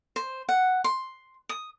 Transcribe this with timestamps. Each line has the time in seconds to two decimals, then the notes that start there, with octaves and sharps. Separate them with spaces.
0.16 C5
0.49 F#5
0.84 C6
1.49 D#6